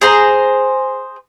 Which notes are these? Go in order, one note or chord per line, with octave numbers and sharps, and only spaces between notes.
G#4 C5 A#5